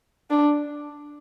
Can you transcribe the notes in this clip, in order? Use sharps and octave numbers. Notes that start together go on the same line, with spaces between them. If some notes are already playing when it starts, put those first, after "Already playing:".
D4